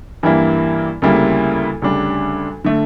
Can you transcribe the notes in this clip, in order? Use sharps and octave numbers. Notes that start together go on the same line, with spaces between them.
G2 E3 G3 A#3 E4
D2 C#3 G3 A#3 E4
D2 C#3 G3 D4
D3 A3